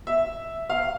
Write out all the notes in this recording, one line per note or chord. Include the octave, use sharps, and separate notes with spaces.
E5
F5